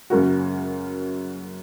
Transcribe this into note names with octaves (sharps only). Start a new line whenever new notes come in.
F#2 C#3 A#3 C#4 F#4